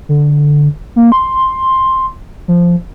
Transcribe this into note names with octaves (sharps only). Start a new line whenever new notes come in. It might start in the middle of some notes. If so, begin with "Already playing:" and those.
D3
A#3
C6
F3